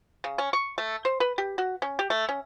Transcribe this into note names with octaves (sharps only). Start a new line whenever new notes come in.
C#3
C#4
C#6
A3
C5
B4
G4
F#4
C#4
G4
A3
C#4